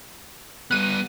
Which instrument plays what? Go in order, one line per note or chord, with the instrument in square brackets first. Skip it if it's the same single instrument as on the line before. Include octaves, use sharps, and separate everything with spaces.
[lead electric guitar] G3 B3 [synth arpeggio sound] F#6 D#7